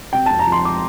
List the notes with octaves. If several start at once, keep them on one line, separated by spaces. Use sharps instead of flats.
C3 G5
F2 A5
A#5
F3 C6
D6